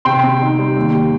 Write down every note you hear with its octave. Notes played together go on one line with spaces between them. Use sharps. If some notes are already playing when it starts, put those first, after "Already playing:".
C3 G5 C6
C4
D#4
G3
D#2
G3